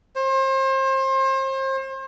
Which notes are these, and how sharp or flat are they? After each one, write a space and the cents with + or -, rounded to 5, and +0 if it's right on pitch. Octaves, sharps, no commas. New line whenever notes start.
C5 +35